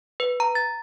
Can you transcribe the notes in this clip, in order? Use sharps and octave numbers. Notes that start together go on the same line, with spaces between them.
B4
A#5
A6